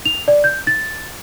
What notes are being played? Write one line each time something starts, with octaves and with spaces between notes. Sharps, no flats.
F7
D5
G6
A6